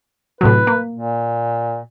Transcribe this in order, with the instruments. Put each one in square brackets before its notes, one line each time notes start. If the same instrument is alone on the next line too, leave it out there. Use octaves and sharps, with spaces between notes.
[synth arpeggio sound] A2 C3 F#3 [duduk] B4
[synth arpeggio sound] A#3
[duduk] A#2